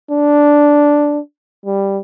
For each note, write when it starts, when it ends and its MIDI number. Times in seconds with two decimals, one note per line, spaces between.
0.10 1.19 62
1.65 1.99 55